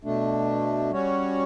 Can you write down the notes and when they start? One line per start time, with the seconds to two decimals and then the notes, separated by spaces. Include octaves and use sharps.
0.04 B2 A3 D4
0.90 G3 C#4 F#4 C#5